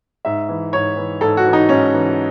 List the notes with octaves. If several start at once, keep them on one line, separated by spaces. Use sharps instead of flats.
G#2 E5
E3
G#2 C#5
E3
G#2 A4
F#4
E3
D#4
G#2 C#4
E3